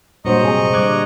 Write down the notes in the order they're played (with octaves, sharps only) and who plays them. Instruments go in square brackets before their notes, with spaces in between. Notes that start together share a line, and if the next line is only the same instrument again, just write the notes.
[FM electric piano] G2 F#3 [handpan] A#2 C5 [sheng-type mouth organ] D#5 A#5 C#6
[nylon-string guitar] C3 G#5 [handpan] G#4
[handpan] D3 G3 [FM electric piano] D6 F#6 G#6